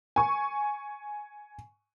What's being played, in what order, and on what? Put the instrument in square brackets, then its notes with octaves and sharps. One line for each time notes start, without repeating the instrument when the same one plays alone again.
[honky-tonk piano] G#5 C#6